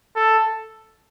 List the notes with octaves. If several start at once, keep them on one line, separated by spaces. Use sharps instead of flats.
A4